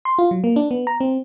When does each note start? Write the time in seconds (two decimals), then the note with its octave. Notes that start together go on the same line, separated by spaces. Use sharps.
0.05 C6
0.18 F4
0.31 F#3
0.44 A#3
0.56 D4
0.71 B3
0.87 A#5
1.00 C4